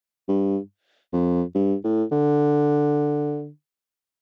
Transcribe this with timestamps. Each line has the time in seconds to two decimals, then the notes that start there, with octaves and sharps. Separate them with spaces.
0.29 G2
1.13 F2
1.55 G2
1.84 A2
2.12 D3